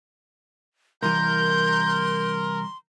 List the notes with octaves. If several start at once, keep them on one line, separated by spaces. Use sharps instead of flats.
C2 E3 A#4 C6 G6